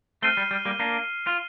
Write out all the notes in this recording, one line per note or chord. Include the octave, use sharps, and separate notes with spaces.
A3 C4 F6 C7 D#7 G7
G3
G3
G3 A#3
A#3 D4
F4